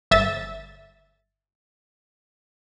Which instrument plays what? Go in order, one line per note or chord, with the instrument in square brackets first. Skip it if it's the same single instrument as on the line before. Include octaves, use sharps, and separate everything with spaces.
[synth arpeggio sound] G1 E5 A6